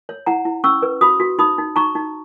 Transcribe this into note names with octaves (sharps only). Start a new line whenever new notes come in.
C#5
E4 F#5 A#5
E4
C#4 C#6 E6
B4
F#4 B5 D#6
F#4
D#4 B5 D#6
D#4
D#4 A#5 C#6
D#4